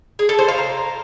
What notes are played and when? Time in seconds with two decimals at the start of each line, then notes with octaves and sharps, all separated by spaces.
0.19 G#4
0.29 A4
0.39 C5
0.48 F5
0.58 A#4